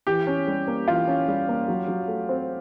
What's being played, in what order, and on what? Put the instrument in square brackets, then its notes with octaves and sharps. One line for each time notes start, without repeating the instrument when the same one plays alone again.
[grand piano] E3 [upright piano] G4
[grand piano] C#4
G3
A#3
[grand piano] E3 [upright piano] F4
[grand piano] C#4
G3
A#3
F#3
F#3
A3
C4